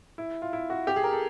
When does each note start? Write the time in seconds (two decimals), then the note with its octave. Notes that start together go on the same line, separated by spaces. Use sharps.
0.18 E4
0.42 F4
0.53 E4
0.70 F#4
0.87 G4
0.96 G#4
1.04 A#4
1.13 A4